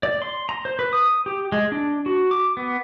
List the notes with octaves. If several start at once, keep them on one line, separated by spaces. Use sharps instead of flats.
D5
C6
A#5
C5
B4
D#6
G4
G#3
D4
F#4
D6
B3